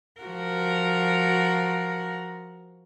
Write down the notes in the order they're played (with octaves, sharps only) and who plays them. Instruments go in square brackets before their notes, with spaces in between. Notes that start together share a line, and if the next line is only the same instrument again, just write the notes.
[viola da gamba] F3 F#4 A#4